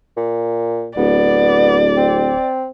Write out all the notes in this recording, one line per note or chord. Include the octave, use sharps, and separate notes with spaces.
A#2
D1 B3 D5
C4